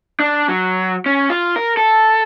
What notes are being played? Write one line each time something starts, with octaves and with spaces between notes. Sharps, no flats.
D4
F#3
C#4
F4
A#4
A4